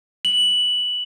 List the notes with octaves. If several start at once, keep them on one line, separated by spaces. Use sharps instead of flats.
F#7